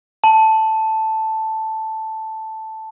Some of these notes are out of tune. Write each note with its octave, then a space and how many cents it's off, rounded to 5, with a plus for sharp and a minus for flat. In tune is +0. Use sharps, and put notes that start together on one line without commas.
A5 +0